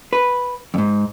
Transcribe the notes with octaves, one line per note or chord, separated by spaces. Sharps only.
B4
F2 G#2